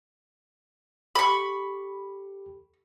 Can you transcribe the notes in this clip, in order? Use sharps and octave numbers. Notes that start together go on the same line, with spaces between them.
G4 A4 B5 C#6